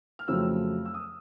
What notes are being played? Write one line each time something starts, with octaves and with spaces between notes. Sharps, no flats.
F6
F2 C#3 F#3 A3 C4 E6
E6
D#6